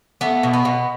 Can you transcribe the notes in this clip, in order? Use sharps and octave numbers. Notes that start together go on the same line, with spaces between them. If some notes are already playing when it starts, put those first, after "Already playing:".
A3 B3
B2
B3
B2